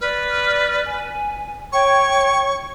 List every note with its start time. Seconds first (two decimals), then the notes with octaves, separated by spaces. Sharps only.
0.01 B4 D5 F6
0.86 G#5
1.72 C#5 G5 C#6